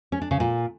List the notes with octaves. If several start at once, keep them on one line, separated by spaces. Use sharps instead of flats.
C#4
D4
C#3
A#2